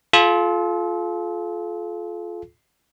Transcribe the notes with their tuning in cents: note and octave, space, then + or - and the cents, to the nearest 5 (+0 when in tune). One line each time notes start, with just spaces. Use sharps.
F4 +0 A4 -40